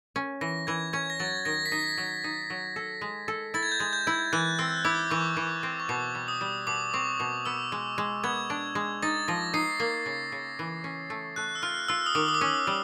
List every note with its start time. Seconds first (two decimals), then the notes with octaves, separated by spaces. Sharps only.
0.16 C#4
0.41 E3 A#6
0.67 E3 G#6
0.93 C#4 G#6
1.10 A#6
1.20 F#3 A6
1.45 D#3 A#6
1.66 B6
1.72 D#4 A#6
1.98 F#3
2.24 D#4
2.50 F#3
2.76 A4
3.01 G#3
3.28 A4
3.54 E4 A6
3.63 G#6
3.72 G6
3.80 G#3 G#6
3.93 G6
4.07 E4
4.33 E3 F#6
4.59 C4 E6
4.85 E4 D6
5.11 E3 C#6
5.37 E3
5.63 C4
5.80 C#6
5.89 B2 D6
6.15 G3
6.28 D#6
6.41 G3
6.67 B2 D6
6.94 C4 C#6
7.20 B2
7.45 B3 E6
7.72 G#3
7.98 G#3
8.24 B3 G#6
8.50 D4
8.75 G#3
9.02 D#4 A6
9.28 F3 A#6
9.54 D#4 C7
9.80 A#3 C7
10.06 C#3
10.32 C#3
10.59 E3
10.84 C#4
11.10 A3
11.36 A3 F#6
11.55 E6
11.62 F4 F6
11.88 F4 E6
12.06 D#6
12.15 D#3 D6
12.28 D#6
12.34 D6
12.41 C#4
12.67 G3